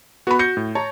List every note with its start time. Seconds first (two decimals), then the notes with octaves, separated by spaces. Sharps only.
0.27 B3 F#4 B5
0.39 G6 A#6 C#7
0.57 A2
0.75 C#5 A5 A#5